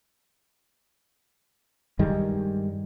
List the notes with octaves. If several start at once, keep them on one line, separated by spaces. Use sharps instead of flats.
G2 D#3 G3 G#3